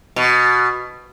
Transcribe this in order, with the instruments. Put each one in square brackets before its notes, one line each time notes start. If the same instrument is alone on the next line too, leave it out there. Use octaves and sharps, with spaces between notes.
[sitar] B2